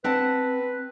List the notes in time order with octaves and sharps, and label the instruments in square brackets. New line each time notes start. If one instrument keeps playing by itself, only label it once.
[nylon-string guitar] C4 F#5 A5 [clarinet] B4